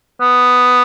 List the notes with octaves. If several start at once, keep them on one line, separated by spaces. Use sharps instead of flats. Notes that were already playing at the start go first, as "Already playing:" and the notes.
B3